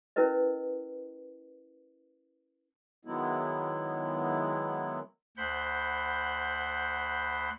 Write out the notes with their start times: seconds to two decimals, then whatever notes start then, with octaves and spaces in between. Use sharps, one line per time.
0.16 C#4 E4 A#4 B4 D#5
3.05 D#3 F#3 G#3 B3 E4
5.37 D2 C5 F#5 B5 G6